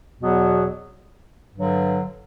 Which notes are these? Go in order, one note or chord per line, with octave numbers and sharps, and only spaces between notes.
E2 B2 F#3 B3
G2 D3 F#3